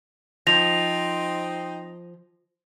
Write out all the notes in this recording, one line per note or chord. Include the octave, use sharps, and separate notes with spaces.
F3 C4 D#4 A#6 F7